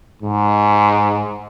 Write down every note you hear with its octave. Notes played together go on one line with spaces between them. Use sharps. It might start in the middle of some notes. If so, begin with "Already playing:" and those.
G#2